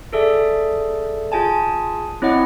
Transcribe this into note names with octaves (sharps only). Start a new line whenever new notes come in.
G#4 A4 D5 E5
F4 G#4 G#5 A5
C4 E4 C#5 D#5 F#5